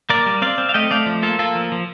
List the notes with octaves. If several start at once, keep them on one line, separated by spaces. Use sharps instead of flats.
A#3 A#4 D5
G3
C4 D5 F5
C4
F5
A3 D#5 G5
A3 D5 F5
F3
A#3 F4 A4
A#3 F4 A4
F3
F3